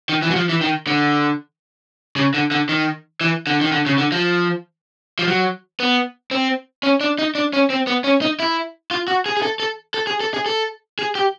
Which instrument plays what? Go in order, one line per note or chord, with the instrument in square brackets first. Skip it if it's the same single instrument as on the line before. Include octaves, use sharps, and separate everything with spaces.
[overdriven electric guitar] D#3
E3
F#3
F3
E3
D#3
D3
C#3
D3
D3
D#3
E3
D3
D#3
D3
C#3
D3
F3
F3
F#3
B3
C4
C#4
D4
D#4
D4
C#4
C4
B3
C#4
D#4
E4
F4
F#4
G#4
G#4
A4
A4
A4
G#4
A4
G#4
A4
G#4
G4